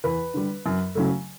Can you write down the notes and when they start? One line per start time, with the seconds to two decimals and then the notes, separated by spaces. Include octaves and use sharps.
0.04 E2 B4
0.34 D3 G3
0.66 F#2
0.95 C#3 F#3 A3